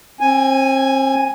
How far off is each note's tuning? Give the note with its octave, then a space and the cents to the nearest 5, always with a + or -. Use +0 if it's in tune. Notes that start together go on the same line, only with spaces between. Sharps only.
C4 +35 G#5 +0